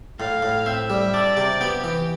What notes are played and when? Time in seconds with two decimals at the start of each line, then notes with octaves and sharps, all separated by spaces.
0.20 A2 F5
0.42 A2
0.66 C4 E5
0.90 G3
1.14 D4 D5
1.37 C3
1.61 B3 G4
1.84 E3